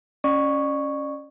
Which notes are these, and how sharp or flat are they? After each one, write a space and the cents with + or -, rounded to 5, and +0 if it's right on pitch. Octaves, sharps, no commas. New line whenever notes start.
C#4 +0 D5 +40 C#6 +0